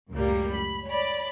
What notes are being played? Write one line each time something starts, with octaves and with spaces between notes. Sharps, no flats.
C#2 F#2 A2 G3 A#3
B5
C#5 D5 B5